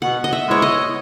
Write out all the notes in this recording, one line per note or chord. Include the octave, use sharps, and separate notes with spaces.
B2 F#5
D#5
E5
G#3 B3 E4 C#5
D#5